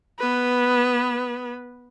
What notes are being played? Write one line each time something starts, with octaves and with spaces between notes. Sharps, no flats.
B3 B4